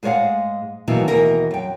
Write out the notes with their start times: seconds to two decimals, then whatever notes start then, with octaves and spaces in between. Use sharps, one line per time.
0.03 G#2 G#3 G#4 C#5 F5 F#5
0.87 B2 D#3 E3 F#3 A#3 B3
1.07 D#2 B2 E3 G#4 A#4 G#5
1.51 F#2 G5